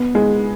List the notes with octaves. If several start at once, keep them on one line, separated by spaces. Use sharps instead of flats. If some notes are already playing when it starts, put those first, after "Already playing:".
Already playing: B3
G#3